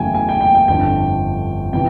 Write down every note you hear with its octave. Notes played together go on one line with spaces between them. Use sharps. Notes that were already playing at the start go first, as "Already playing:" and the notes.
Already playing: F#1 E2 C#3 F#3 A3 G5 G#5
G#5
G5
G5
G5
G1 F2 D3 G5
C3 E3 G5